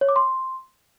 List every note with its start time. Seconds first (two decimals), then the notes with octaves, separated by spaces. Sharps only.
0.01 C#5
0.09 D6
0.16 C6